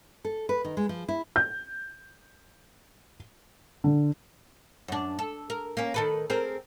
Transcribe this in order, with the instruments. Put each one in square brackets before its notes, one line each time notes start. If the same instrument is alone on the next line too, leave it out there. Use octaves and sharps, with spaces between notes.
[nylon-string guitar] A4
B4
D#3
G#3
F3
E4
[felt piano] G6
D3
[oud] F#2 D4
A4
A#4
A#3 C#4
D#3 A4 B4
C4 G#4 A#4